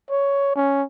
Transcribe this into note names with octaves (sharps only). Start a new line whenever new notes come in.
C#5
C#4